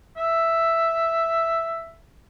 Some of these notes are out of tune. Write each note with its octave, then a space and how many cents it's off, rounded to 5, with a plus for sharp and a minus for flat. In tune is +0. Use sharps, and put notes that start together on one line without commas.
E5 +5